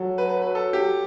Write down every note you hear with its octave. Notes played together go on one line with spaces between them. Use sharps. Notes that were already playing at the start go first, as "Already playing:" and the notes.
Already playing: F#3 A4
B4
B4
B4
A4
G4